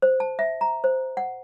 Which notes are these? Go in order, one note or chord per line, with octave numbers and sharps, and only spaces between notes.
C5
A5
E5
A#5
C5
F#5